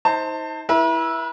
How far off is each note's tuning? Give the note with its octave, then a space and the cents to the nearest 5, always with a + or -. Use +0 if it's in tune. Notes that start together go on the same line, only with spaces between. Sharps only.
D#4 +35 C5 +0 A5 +30
E4 +0 B4 -40